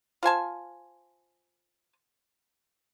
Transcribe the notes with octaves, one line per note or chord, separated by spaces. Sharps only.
F4 C5 G#5 A5